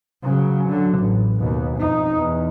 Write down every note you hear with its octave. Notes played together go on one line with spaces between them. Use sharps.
C#3 F#3
D3 F#3
A1
D#2 B2
F2 D#4
E2